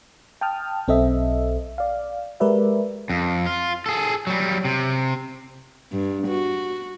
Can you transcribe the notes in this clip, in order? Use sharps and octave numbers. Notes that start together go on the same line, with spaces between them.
G5 A5 D#6 F6
B1 C4 A4 D#5 E5
D5 F5
G#3 G4 A#4 B4 D5 E5
F2
F4
G#4 A4
F#3 G3
C3
G2
F#4